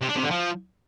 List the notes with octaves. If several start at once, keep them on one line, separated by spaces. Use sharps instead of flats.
C3
D4
C3
D3
F3